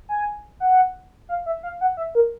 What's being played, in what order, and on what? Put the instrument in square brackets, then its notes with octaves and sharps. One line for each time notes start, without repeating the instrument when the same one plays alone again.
[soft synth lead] G#5
F#5
F5
E5
F5
F#5
E5
A#4